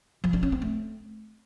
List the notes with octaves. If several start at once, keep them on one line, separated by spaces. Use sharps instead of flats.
F3
D4
C#4
C4
A3